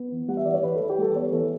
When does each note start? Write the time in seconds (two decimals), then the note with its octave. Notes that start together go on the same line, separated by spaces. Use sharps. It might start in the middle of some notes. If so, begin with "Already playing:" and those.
Already playing: B3
0.12 E3
0.28 G3 F#5
0.37 E5
0.45 E3 D5
0.54 C#5
0.63 E3 B4
0.76 A4
0.81 E3
0.90 G4
0.98 G3 A4
1.15 B3 C#5
1.32 E3 A4